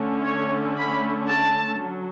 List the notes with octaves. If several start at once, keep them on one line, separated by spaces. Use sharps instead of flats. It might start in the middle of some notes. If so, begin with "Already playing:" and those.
Already playing: D3 A3 C#4
C#5
B5
A5
F#3